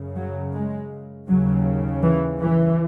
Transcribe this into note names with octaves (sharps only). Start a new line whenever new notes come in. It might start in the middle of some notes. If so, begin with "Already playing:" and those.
Already playing: F#2 C#3
F#3
G#3
D#2 C#3 F#3
E3
E3